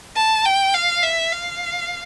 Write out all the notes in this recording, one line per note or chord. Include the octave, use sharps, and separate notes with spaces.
A5
G5
F5
E5
F5